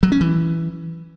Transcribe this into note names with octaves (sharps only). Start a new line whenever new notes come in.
F#3
C#4
E3